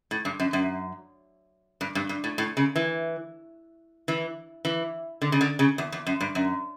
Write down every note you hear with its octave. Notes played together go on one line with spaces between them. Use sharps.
A2
G2
F#2
F#2
G2
G2
G2
A2
A2
C#3
E3
E3
E3
D3
C#3
D3
C#3
E2
E2
F#2
G2
F#2